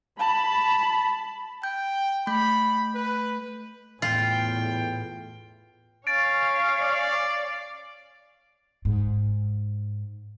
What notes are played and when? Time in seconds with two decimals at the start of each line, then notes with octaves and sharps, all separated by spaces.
0.19 A5 B5
1.63 G5 G6
2.27 A3 B5 G6
2.95 B4
4.02 E2 A2 F4 G5
6.07 C#4 C#5 F5 A6 D7
6.81 D5
8.85 G#2